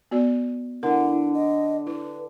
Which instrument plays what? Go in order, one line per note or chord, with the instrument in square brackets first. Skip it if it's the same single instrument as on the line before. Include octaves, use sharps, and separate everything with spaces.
[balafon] B3 F#4 D5
[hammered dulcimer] D3 [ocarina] E4 [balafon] A#4
[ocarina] D#5
[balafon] E4 [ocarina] B4